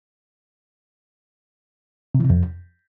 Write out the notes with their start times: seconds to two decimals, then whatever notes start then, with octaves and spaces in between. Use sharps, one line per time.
2.15 C3
2.20 E3
2.25 C3
2.30 F2